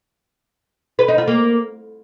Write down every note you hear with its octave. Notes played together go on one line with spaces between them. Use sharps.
B4
D#4
F4
A#3